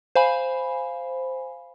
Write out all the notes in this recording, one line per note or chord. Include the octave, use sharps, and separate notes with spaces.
C5 F5 G#5 B5